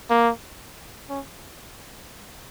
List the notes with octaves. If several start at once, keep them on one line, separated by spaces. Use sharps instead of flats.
A#3
C#4